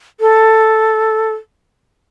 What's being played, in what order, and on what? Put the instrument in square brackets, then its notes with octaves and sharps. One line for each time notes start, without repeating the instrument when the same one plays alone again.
[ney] A4